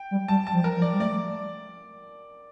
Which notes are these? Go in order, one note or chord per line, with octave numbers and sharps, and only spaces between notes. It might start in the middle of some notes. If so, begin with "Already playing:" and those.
Already playing: G5
G3
G3 A5
A5
F3
A#4
F3
D5
G3
A3 D5